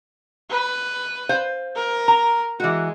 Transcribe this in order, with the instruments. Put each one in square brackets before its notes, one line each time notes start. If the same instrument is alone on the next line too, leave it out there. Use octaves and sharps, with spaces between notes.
[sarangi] B4
[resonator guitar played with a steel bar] C5 F5
[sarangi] A#4
[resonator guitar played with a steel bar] A#5
[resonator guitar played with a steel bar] E3 F#4 [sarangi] G#3